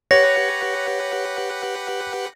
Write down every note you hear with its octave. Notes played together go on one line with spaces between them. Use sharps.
G4 B4 C#5 F#5 A#6